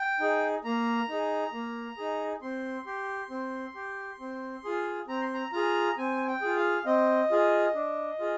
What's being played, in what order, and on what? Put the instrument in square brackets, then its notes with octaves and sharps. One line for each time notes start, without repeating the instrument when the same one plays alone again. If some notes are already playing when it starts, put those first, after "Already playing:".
Already playing: [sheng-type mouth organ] G5
D#4 G#4
A#3 A#5
D#4 G#4
A#3
D#4 G#4
C4 C6
G4 C6
C4
G4
C4
F4 G#4
C4 A#5
C6
A#5
F4 G#4 A#5
C4 G#5
G5
F4 G#4
F5
C4 D#5
F4 G#4
D4
F4 G#4